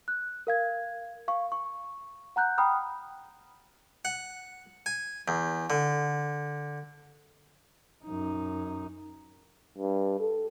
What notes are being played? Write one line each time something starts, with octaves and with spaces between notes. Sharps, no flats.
F#6
A#4 F5 G#6
F5 C#6
C#6
F#5 A#5 F#6 G6
G5 A#5 B5 D#6 F6
F#5
G#5
E2
D3
F#2 D#4
G2
A4